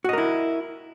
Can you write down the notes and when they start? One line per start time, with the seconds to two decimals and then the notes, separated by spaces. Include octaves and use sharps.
0.04 F#4
0.09 D#5
0.13 A#4
0.18 E4